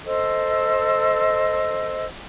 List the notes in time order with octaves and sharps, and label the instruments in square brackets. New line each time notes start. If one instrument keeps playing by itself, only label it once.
[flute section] A4 C5 D#5 E6